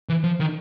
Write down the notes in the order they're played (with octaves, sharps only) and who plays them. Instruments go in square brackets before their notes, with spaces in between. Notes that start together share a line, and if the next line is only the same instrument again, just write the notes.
[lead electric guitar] E3
F3
D#3